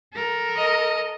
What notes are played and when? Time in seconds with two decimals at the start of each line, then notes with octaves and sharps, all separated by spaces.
0.13 A4 A#4
0.56 D#5